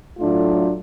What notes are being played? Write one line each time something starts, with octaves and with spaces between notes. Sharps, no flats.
A2 F#3 A3 D4 F4